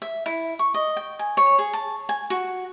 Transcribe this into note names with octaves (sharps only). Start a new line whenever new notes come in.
E5
E4
C#6
D#5
G5
G#5
C#5
G#4
A5
G#5
F#4